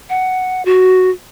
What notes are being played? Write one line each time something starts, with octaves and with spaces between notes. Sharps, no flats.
F#5
F#4